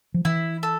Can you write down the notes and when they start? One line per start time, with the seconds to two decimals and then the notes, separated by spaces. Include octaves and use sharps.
0.14 F3
0.25 E3 E4
0.63 A4